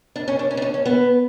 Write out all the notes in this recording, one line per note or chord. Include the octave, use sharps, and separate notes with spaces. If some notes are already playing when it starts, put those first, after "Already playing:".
D4
C#4
D4
C#4
D4
C#4
C#4
B3